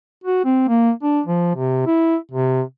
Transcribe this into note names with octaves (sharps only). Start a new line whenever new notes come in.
F#4
C4
A#3
D4
F3
C3
E4
C3